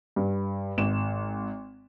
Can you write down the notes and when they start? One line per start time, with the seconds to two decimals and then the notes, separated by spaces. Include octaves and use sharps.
0.16 G2
0.78 G#1 E7